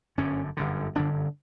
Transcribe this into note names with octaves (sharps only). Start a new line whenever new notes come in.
G1 F#2 D3 C#4
G1 F#2 D3
G1 F#2 D3 D4